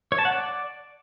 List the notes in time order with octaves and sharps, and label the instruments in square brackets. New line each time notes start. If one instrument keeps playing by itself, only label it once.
[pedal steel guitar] C#5
A5
F#5
D5